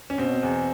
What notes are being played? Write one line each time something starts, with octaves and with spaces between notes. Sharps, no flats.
C#4
B2 C4
E2